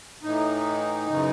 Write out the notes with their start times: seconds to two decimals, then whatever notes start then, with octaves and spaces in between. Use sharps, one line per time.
0.23 A2 E3 D#4
1.07 F#2 C#3 E3